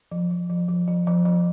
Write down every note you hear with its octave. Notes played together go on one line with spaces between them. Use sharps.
F3
F3
F3
F3
F3
F3
F3